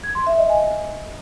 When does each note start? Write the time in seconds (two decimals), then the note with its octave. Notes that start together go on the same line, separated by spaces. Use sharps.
0.04 G#6
0.15 C6
0.27 E5
0.38 D#5
0.50 G#5